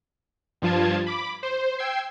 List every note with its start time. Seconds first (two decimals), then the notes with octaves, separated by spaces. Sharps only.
0.62 G2 F3 F4 A5 G#6
1.07 B5 D6
1.43 C5
1.78 G5 E6 G#6 C7